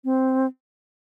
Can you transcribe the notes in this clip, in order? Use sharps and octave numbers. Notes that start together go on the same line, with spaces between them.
C4